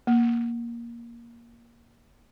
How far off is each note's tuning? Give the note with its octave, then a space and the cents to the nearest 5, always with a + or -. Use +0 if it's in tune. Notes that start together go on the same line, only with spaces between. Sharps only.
A#3 +10